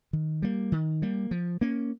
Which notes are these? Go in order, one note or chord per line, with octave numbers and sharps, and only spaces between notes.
D#3
G3 A#3
D#3
G3 A#3
F3
A#3 C#4